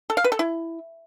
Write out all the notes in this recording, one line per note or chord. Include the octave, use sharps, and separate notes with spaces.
A4
F5
B4
A4
E4